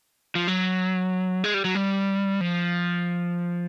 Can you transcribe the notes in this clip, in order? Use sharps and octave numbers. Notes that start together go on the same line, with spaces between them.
F3
F#3
G#3
G3
F#3
G3
F3